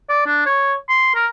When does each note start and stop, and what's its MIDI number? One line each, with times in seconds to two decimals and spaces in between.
0.09 0.22 74
0.26 0.45 62
0.46 0.74 73
0.89 1.12 84
1.15 1.27 70